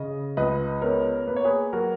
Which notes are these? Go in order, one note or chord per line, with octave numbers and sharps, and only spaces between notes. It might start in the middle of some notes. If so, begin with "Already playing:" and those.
Already playing: C#3 D#5
C#2 B4 D#5
B3 A#4 C#5
A#3 B4
C#5
G#4 B4
F#3 F#4 A#4